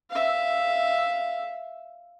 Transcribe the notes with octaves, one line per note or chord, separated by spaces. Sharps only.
E5 F5